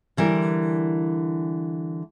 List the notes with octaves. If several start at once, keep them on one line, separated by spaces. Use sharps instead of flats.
D3 E3 G3 A#4